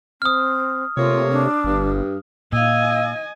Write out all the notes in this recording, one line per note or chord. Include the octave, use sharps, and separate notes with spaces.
C4 D#6 F6
C3 A3 A#3 F4 C#5
D4
G1 G2
A#2 D#5 F5 G#5 E6